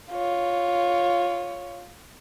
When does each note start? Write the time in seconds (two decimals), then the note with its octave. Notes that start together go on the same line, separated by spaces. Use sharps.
0.11 F4 C#5